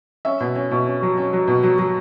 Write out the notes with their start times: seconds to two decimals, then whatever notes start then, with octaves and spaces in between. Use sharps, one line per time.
0.25 C#4 E5
0.40 B2
0.56 C#4
0.71 B2
0.86 C#4
1.02 F#3
1.17 C#4
1.33 F#3
1.48 B2
1.63 F#3
1.78 F#3